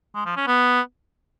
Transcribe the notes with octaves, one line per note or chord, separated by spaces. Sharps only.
G#3
F3
C#4
B3